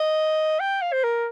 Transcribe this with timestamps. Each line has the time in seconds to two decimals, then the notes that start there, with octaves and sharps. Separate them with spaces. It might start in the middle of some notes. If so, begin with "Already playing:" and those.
Already playing: D#5
0.60 G5
0.82 F5
0.93 C5
1.04 A#4